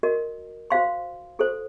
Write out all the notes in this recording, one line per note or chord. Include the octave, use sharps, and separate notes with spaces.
F#4 A#4 D#5
F#4 C5 F5 C6
F#4 A4 C5